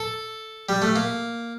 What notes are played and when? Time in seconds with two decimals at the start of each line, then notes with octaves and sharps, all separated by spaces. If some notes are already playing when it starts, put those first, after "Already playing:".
Already playing: A4
0.69 G3
0.82 A3
0.96 A#3